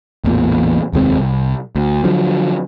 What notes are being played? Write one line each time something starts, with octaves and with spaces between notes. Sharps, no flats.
A1 E2 A#2
F1 D#2 G#3 C4
C2
D2
D3 F3 F#3